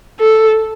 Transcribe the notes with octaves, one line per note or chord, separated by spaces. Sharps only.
A4